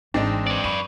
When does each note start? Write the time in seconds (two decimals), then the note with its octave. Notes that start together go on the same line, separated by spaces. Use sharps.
0.14 G#1 E3 G#3 C4 D4 D#4
0.46 B4 D5
0.64 F#2 B5 C#6 D#7